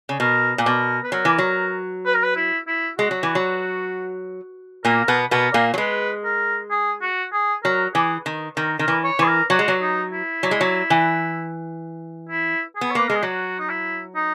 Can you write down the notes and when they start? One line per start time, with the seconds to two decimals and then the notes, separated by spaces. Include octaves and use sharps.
0.09 C#3
0.20 B2 A#4
0.58 A#2
0.66 B2 A#4
1.04 B4
1.12 F#3 A#4
1.25 E3
1.38 F#3
2.06 B4
2.14 A#4
2.23 B4
2.36 E4
2.68 E4
2.98 G#3 F#4
3.11 F#3
3.23 E3
3.35 F#3
4.84 A#2 A#3 A#4
5.08 B2 B3
5.31 B2 B3 A#4
5.54 A#2 A#3
5.74 F#3
5.78 G#3 B4
6.25 A#4
6.71 G#4
7.02 F#4
7.33 G#4
7.64 F#3 A#4
7.95 E3 G#4
8.26 D#3
8.57 D#3 A#4
8.79 D#3 A#4
8.88 E3
9.04 C#5
9.19 E3 G#4
9.28 A#4
9.50 F#3 F#4
9.59 G#3
9.68 F#3
9.81 D#4
10.12 E4
10.43 F#3
10.51 G#3
10.61 F#3
10.90 E3
12.29 E4
12.76 G#4
12.81 B3
12.91 C#5
12.95 A#3 B4
13.07 G#3 A#4
13.16 G#4
13.23 F#3 F#4
13.60 D#4
13.70 E4
14.16 D#4